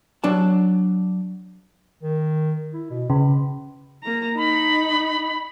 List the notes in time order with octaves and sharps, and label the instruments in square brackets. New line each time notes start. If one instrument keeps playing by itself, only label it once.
[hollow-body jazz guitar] F#3 D4 A5
[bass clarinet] D#3
E4
B2
[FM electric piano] C#3 [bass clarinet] B4
[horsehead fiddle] A#3 A#5
[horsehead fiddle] D#4 [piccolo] B5